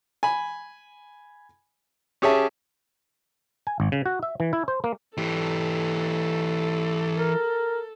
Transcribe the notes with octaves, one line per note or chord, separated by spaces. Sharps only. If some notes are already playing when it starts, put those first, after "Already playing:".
G#5 B5
C#4 G4 G#4 C#5 E5 A5
G#5
G#1
C#3
F#4
E5
E3
E4
C5
A#3
E3 G4 A4
A#4